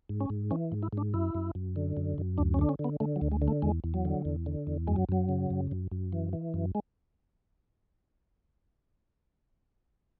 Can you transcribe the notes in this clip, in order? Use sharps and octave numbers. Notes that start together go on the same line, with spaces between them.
G#2
C#4
G#2
E3 C#4
G#2
E4
G#2 D4
F#2 E4
F#2
F#2
D3
F#2
F#2
D2 D4
C#4
D3 D4
C#4
D3
B3
D3 A3
F#3
D2
G#3
D3
A3
E2 G#3
E2
F#3
D3
E2
D3
E2
F#2 G#3
F#3
F#2 F#3
C#3
F#2
F#2
F#2
E3
E3
F#2
G#3